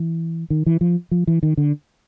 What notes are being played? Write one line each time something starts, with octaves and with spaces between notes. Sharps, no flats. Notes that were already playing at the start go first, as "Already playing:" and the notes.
Already playing: E3
D#3
E3
F3
F3
E3
D#3
D3